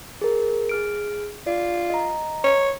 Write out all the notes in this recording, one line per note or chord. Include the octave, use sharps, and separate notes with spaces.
G#4 A#4
G#4 F6 D7
F4 D5
D#5 A#5
C#5